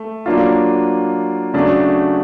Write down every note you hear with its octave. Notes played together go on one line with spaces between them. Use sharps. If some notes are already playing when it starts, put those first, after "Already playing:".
Already playing: A3
F#3 A#3 D4 F4
C#3 F#3 A3 D4